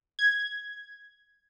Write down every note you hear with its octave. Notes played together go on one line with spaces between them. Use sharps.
G#6